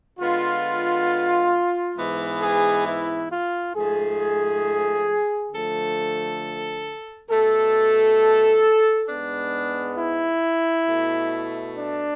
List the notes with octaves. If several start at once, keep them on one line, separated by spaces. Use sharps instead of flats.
D3 G#3 B3 F4
G#2 E3 G#3 B3
G#4
E4
F4
G#2 F3 A3 G#4
D3 F3 A3 A4
B2 A3 A4
G#2 G#3 B3 D4
E4
B2 A3
D4